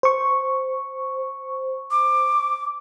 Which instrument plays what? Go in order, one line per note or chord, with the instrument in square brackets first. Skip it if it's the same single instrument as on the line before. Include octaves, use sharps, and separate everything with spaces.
[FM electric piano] C5 C#6
[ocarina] D6